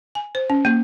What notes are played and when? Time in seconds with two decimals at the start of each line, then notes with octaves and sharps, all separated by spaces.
0.15 G#5
0.35 C5
0.50 C#4
0.65 A#3